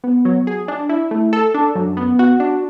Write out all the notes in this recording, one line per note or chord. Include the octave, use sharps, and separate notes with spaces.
B3
F#3
G#4
D4
E4
A3
A4
D4
F#2
B3
F#4
D4